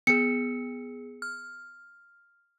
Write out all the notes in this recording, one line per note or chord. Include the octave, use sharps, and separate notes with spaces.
B3 G#4 C#7
F6